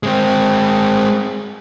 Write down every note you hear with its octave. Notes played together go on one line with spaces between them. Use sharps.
G#3 C4